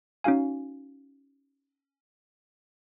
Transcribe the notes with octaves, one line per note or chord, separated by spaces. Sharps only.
C#4 D#4 F#4 F5 G#5